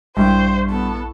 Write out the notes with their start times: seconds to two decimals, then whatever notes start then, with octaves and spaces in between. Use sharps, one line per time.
0.17 A#1 G2 E4 C5 G5 C#6
0.70 B3 A4